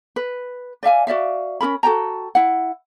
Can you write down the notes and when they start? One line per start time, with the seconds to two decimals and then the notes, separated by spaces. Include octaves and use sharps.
0.16 B4
0.83 D5 E5 F5 G#5
1.07 F#4 D5 E5 F5
1.61 C#4 F#4 A#4 B5
1.83 F#4 A4 G5 A#5
2.35 E4 F#5